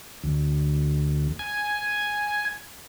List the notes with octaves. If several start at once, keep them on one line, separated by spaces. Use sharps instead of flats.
D2
G#5